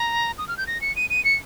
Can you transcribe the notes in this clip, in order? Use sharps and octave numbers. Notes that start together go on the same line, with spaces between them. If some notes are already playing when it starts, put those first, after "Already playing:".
Already playing: A#5
D#6
F6
G6
A#6
C#7
D#7
D#7
C#7